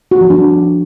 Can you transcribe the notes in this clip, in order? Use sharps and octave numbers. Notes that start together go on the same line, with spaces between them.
F#4
F3
D4